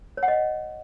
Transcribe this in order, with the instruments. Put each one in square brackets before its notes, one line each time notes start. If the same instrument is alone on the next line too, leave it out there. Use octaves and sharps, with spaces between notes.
[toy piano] C#5
F#5
D#5